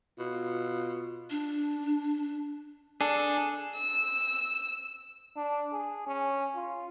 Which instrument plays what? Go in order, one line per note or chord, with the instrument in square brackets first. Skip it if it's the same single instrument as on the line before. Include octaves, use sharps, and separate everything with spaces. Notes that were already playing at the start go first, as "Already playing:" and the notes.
[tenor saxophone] B2 [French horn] F4
[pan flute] D4
[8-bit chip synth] D4 [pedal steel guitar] G#4 A4
[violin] E6
[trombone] D4
G#4
C#4
F4